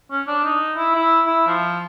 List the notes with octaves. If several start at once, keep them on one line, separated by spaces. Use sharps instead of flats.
C#4
D4
D#4
E4
E4
E4
F3